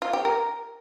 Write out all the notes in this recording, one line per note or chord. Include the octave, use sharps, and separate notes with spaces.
F4
G4
A#4